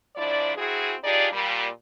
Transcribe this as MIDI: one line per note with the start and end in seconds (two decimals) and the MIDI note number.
0.16 0.53 44
0.16 0.53 53
0.16 0.53 62
0.16 0.53 64
0.16 0.53 74
0.56 0.93 60
0.56 0.93 64
0.56 0.93 66
0.56 0.93 68
1.03 1.27 62
1.03 1.27 63
1.03 1.27 65
1.03 1.27 67
1.03 1.27 68
1.03 1.27 74
1.32 1.66 46
1.32 1.66 55